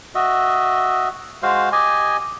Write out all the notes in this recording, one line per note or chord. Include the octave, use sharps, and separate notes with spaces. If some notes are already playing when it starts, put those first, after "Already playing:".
F#4 D#5 E5
G#3 F#4 C5 F5
G4 D#5 G#5